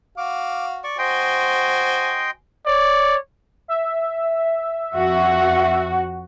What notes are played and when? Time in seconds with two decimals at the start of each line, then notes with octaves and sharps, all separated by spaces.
0.18 F#4 F5 D6
0.84 D5 C#6
0.99 F#4 C5 D#5 G5 G#5 C6
2.66 C#5 D5
3.68 E5
4.93 F2 F#4